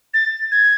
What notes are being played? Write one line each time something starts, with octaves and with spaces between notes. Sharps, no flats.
A6
G#6